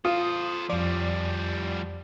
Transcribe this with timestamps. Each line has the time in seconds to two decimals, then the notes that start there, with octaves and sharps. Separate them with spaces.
0.05 F4 A4 C5 D#6
0.70 F2 F3 G3 D5